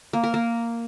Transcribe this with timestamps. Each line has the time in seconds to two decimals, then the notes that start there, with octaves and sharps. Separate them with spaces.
0.13 A#3
0.24 A#4
0.34 A#3